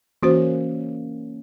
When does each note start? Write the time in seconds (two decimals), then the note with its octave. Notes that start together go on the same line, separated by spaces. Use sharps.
0.23 E3 A#3 C#4 F#4 C5